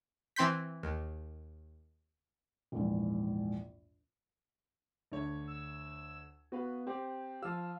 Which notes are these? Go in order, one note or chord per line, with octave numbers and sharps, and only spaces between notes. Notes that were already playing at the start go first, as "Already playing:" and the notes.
E3 C4 C6 G6 B6
D#2
A#1 E2 G#2
D2 D3 C#5
E6
B3 F#4 B4 F5
C4 G4
F3 F5 E6